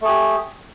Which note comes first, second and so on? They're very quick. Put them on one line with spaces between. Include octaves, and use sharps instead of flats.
A3 G#4 G4